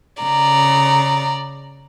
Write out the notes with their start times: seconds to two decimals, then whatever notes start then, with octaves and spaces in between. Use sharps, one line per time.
0.22 C#3 D5 A#5